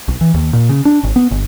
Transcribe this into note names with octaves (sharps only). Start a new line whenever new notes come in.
B1
E3
D#2
A#2
C#3
D4
G#1
B3
G1